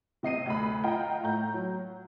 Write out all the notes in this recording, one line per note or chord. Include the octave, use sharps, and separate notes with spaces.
C3 D#5 C7 D#7
D2 B5
F4 D#5 F#5 G5 A#5
A2 A#5 G6
F#3